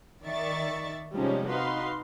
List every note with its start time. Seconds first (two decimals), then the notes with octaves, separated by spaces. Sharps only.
0.23 D#3 D5 E5 C#6 A6
1.13 C3 F3 G3 G#3 C#4 D#4
1.50 D#4 F#4 B4 F5 C6